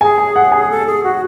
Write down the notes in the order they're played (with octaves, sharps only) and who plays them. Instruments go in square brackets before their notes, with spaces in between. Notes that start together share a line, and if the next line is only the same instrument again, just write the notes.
[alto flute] G#4 [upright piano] G#5
[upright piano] G#5
F#5
G#5
[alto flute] A4
G#4
F#4